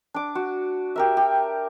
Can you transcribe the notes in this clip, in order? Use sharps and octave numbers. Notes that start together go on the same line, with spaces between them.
D4 D6
F#4
G4 A#4 E5
G4